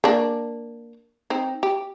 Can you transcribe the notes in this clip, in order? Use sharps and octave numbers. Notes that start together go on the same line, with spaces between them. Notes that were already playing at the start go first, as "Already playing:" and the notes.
A#3 D4
C4 D#4
G4